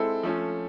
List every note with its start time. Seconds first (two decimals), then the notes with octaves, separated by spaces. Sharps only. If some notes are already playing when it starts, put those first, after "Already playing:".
Already playing: G#3 C4 E4 A4
0.23 F3 A3 C#4